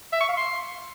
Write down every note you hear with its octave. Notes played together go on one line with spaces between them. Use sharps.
E5
C#6
F5
C6